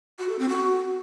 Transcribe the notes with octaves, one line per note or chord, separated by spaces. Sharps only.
F#4
A4
C4
F#4